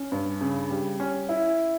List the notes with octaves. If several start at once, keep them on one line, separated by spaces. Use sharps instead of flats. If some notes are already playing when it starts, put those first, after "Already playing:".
Already playing: C#4
G2
C#3
G3
C#4
E4